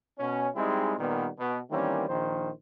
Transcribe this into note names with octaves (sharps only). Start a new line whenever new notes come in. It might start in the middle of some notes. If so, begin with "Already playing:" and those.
B2 C#4
G3 G#3 C4 D#4 E4 G#4
A#2 D#3 G3 B3
B2
D#3 E3 G3 A#3 C4 C#4
A#1 D#3 C5